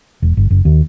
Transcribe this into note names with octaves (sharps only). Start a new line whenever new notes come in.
E1
G1
F#1
D#2